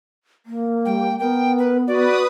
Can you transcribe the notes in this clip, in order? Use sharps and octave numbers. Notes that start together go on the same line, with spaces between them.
A#3
G3 G5
B3 A#4 G5
B4
F#4 B4 D5 D#6